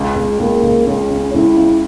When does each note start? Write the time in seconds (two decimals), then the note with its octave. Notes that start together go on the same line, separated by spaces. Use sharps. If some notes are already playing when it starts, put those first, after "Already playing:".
Already playing: C#2 G#3
0.16 C#2
0.39 C#2 A#3
0.63 C#2
0.87 C#2 C#4
1.11 C#3
1.34 C#2 E4
1.57 C#3